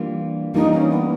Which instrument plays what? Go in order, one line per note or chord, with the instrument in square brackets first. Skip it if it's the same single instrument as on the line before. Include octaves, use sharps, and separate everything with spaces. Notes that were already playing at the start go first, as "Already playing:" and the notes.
Already playing: [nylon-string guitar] E3 G3 A#3 D4 F4
[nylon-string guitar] E3 G3 A#3 D4 F4 [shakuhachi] D#4
[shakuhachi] C#4
B3